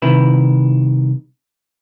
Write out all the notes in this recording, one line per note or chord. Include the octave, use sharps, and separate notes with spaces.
C2 C3 D#3 E4 B4